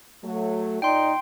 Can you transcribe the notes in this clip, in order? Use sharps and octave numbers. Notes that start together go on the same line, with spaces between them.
F#3 A3
A#2 D#4 D5 G5 C6